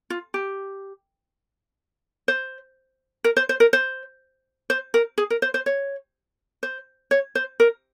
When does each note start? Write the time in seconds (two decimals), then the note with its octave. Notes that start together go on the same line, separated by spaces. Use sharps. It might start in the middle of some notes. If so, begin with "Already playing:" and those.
0.10 F4
0.34 G4
2.28 C5
3.24 A#4
3.37 C5
3.49 C5
3.60 A#4
3.73 C5
4.70 C5
4.94 A#4
5.18 G#4
5.30 A#4
5.42 C5
5.54 C5
5.66 C#5
6.63 C5
7.11 C#5
7.35 C5
7.60 A#4